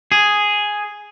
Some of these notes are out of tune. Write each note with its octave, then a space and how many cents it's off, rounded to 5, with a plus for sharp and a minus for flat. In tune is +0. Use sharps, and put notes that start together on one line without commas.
G#4 +0